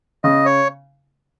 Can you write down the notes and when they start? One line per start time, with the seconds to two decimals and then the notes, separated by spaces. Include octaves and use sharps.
0.24 C#3 D#5
0.46 C#5